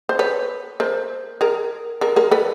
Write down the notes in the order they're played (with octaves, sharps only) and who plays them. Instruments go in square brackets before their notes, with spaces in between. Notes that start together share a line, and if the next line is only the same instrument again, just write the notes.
[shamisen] C5
B4 C#5
A#4 C5
G#4 A#4
G#4 A#4
G#4 A#4
A4 B4